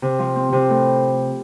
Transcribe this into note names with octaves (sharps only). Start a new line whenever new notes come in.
C3
F3
C4
C3
A2